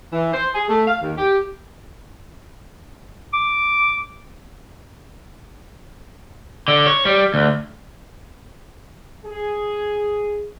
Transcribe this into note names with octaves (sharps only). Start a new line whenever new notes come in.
E3
C5
G#4
A3
F5
D#2
G4
D6
D3
C#5
G3
D2
G#4